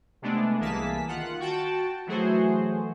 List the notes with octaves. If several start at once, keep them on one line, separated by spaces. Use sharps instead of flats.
C3 G#3 A3 B3 D4
C2 E3 A#3 G#4 A5 B6
D#3 F4 F#5
F#4 G5 A5
E3 F#3 A3 F#4 G#4 C5